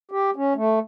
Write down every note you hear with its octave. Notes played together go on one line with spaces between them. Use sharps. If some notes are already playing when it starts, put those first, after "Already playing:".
G4
C#4
A3